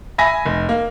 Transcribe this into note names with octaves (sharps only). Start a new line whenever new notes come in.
E5 G#5 B5 A#6
F1
A#3